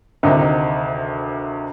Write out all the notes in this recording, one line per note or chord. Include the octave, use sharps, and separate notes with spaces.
D2 C3 D#3 D#4
E4
D#4